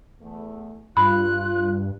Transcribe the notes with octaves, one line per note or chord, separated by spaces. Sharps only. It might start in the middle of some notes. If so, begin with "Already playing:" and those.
E2 A3
G2 F4 B5 F#6